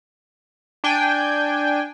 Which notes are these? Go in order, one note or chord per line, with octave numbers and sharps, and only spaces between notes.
D4 G5 G#5